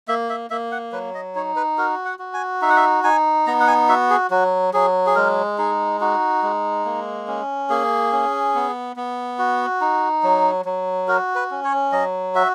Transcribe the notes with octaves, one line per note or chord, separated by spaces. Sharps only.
A#3 E5
E5
A#3 E5
F#5
F#3 B4
D#5
D#4 C#5
B4
F#4 A#4
F#5
F#4
G#5
D#4 E5
F#5
E5
D#4 G#5
B3 A#5
F#5
G#5
F#4 E5
G#4
F#3 F#4
F#3 G#4
G#4
G#3 A#4
D#4 G#4
D#4 F#4
G#3
A#3
C#4
A#3 G#4
C#4
B3
B3
F#4
D#4
F#3
F#3
F#4 A#4
B4
C#4
C#5
F#3 D#5
F#4 E5